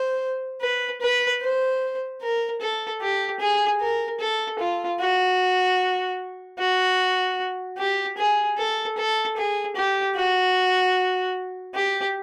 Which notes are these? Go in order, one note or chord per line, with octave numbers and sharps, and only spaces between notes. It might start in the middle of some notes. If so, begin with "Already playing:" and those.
Already playing: C5
B4
B4
C5
A#4
A4
G4
G#4
A#4
A4
F4
F#4
F#4
G4
G#4
A4
A4
G#4
G4
F#4
G4